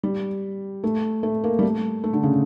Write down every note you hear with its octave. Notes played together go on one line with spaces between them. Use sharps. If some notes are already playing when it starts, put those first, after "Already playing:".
G3
A3
A3
A#3
G3
A3
A3
D3
C#3